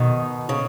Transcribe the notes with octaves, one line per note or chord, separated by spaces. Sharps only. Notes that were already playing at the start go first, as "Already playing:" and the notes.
Already playing: B2 D#3
C#3